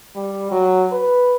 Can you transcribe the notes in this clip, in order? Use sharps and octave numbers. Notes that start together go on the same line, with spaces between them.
G3
F#3
B4